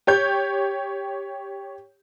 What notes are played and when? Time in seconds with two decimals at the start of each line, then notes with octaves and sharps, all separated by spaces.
0.07 G4 C#5 G6